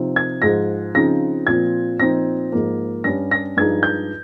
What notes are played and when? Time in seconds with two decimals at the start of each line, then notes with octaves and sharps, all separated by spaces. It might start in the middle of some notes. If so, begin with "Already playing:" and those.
Already playing: C3 F3 C4 D#4
0.16 G#6
0.42 G#2 F3 G#3 A#6
0.95 C#3 F3 C4 D#4 A#6
1.47 A#2 F3 C4 G#6
1.99 A#2 F3 C4 D#4 A#6
2.52 G#2 F3 A#3
3.04 G2 G3 C#4 A#6
3.31 A#6
3.57 G2 F3 G#3 D#4 G#6
3.83 G6